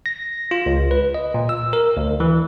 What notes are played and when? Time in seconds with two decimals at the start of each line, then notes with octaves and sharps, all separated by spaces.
0.06 A#6
0.51 F4
0.66 C#2
0.91 B4
1.14 D#5
1.34 A#2
1.49 E6
1.73 A#4
1.97 D2
2.20 E3